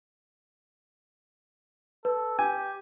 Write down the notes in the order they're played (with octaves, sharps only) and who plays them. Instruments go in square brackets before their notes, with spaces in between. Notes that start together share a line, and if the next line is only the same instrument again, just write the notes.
[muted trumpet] A4 [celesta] B4
[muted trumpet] G4 [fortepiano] G#5